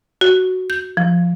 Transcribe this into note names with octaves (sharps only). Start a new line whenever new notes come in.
F#4
G6
F3